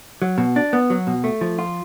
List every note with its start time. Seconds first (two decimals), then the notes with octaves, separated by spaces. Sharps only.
0.22 F#3
0.38 B2
0.56 D4
0.73 B3
0.90 F#3
1.07 B2
1.24 A3
1.41 F3
1.59 F4